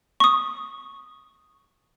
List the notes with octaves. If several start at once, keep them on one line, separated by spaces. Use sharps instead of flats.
C#6 D#6